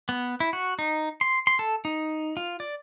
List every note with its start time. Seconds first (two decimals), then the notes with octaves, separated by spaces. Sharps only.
0.09 B3
0.40 E4
0.53 F#4
0.79 D#4
1.21 C6
1.47 C6
1.59 A4
1.85 D#4
2.37 F4
2.60 D5